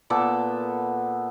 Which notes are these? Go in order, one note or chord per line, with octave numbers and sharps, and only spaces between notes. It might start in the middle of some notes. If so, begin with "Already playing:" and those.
A#2 B3 A4 D6